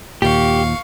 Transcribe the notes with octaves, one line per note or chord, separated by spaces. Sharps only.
D#2 A#2 G4 F5 C#6